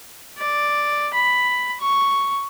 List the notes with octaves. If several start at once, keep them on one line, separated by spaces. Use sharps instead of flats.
D5
B5
C#6